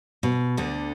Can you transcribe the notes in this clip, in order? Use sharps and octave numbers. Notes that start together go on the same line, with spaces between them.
B2
D2 D3